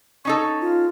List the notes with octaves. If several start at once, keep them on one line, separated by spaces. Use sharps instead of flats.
C#4 D#4 A4 C#6
F4